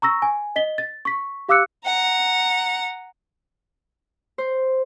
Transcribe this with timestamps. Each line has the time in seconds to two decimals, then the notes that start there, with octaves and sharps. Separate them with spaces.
0.02 A#5 C#6 E6 A#6
0.22 G#5
0.56 D#5 B6 G7
0.78 A6
1.05 C#6 B6
1.49 G4 F5 D6 E6 F#6 C#7
1.85 F#5 A#5
4.38 C5